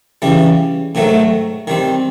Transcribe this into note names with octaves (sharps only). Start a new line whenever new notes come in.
C#3 E3 G3
G#2 D#3 F#3 A3
D#3 G3 C4